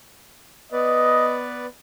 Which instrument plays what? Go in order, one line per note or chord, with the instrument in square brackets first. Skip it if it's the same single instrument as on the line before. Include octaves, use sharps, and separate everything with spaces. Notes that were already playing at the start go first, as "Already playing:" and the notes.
[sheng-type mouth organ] B3 B4 D5 [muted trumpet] D#5